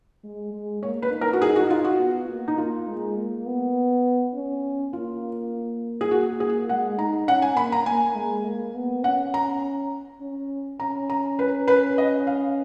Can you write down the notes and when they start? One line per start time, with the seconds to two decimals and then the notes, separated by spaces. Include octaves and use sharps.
0.24 G#3
0.53 G#3
0.83 A#3 C#5
1.02 B4
1.12 D#4
1.21 A#4
1.33 F#4
1.40 D#4 G#4
1.56 F#4
1.70 F4
1.84 F#4
1.99 B3
2.29 A#3
2.48 D#4
2.58 A#3 F4
2.88 G#3
3.18 A#3
3.46 B3
4.34 C#4
4.93 A#3 F4
6.01 G#4
6.10 A#3 F#4
6.40 G#4
6.69 G#3 F#5
6.99 D#4 A#5
7.28 C#4 F#5
7.42 G#5
7.57 A#3 B5
7.72 A#5
7.86 A#3 G#5
8.15 G#3
8.45 A#3
8.75 B3
9.04 C#4 F#5
9.34 A#5
10.21 C#4
10.80 C#4 A#5
11.10 A#5
11.39 B4
11.68 B4
11.98 D#5
12.27 F5